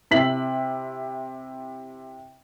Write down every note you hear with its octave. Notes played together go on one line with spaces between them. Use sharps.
C3 E4 B6 F#7